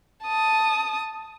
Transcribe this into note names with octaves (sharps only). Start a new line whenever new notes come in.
A5 D#6